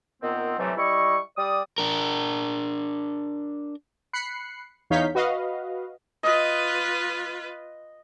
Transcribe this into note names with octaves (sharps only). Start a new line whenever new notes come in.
A#2 D#3 B3 C4
C3 E3 F#3 G3 A3 C4
G3 E4 D#5 C#6
G3 D5 D#6
D4 A#4
B5 F#6 C7 C#7
E2 D#4 C#5 F5 G6 B6
F#4 B4 D#5 F5
F4 B4 D#5